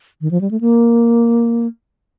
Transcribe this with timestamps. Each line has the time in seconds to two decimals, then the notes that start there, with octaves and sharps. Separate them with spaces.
0.21 D#3
0.31 F3
0.41 G3
0.51 A3
0.61 A#3